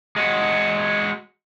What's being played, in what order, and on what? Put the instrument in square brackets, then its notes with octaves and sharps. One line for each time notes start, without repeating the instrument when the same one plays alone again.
[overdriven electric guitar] G#3 F#4